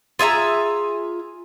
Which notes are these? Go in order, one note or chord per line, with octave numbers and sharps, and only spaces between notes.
F4 G#4 E5 A#5